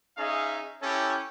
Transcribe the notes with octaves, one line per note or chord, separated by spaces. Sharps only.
C#4 D#4 G#4 E5 F5
C#4 E4 G4 A4 C#5